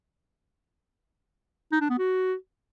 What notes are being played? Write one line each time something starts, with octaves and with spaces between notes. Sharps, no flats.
D#4
D4
B3
F#4